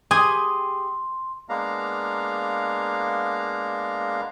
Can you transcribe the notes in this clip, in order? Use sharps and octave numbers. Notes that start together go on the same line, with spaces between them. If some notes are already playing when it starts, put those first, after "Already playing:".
G4 G#4 G#5 C6 D#6
G#3 A#3 B3 D4 F5 A#5